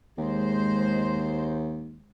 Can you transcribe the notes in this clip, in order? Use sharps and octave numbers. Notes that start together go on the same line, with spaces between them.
D#2 G#3 C5